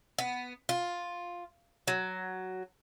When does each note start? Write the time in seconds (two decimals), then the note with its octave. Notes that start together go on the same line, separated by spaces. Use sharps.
0.18 B3
0.69 F4
1.88 F#3